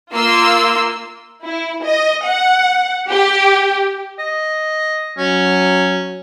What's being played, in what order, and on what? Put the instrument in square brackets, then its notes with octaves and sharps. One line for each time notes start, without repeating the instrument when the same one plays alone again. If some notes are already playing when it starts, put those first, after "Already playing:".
[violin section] A#3 F4 C6 E6
E4
D#5
F#5
G4
[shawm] D#5
[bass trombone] F#3 [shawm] C#4